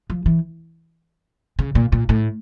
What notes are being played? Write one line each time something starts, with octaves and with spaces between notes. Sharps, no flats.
F3
E3
C#3
A#2
A#2
A2